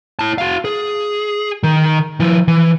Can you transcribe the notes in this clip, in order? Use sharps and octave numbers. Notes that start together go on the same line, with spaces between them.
E4 A5
F#4 F5
G#4
D#3
F3 E4
E3